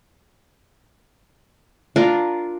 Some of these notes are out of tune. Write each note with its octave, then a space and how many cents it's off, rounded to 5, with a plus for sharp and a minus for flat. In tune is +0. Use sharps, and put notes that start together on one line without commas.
D4 +0 F4 +0 A#4 +0